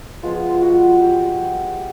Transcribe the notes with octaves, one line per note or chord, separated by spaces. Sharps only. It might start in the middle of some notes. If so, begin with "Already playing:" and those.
F3 G#3 B3 F4
F#4
G4